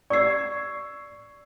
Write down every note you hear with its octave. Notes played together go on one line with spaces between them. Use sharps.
D5 C#6 E6 G#6 C7